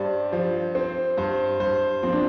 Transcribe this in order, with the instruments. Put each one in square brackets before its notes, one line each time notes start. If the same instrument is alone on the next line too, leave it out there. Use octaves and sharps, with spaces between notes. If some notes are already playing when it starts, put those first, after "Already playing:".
Already playing: [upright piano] G2 [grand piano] G4 C5 D5
[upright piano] F3
[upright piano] C4 [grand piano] C5
[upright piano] G2 [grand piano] C5
[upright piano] G2 [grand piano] C5
[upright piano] F3 [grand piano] C4
[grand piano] D4